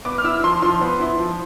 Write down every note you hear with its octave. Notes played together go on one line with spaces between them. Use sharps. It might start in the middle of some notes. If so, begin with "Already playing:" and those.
B3 D6
F6
E4 E6
F3 C6
F3 C6
B3
E4
F3